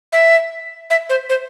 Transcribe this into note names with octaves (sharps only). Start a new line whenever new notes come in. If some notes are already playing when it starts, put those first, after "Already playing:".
E5
E5
C5
C5